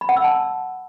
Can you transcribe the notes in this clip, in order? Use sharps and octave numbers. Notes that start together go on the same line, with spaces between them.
B5
F#5
E6
A5